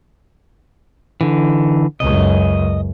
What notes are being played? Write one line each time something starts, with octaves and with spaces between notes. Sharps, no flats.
D3 E3
C#2 F#2 D#5